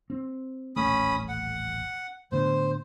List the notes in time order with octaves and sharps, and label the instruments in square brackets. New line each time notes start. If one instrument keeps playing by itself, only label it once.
[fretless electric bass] C4
[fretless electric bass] D#1 A1 A3 [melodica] C#4 B5 D#6
[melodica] F#5
[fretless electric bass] A2 D3 B3 [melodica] C5